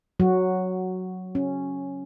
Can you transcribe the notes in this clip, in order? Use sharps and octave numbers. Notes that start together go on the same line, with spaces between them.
F#3 F#4
C#4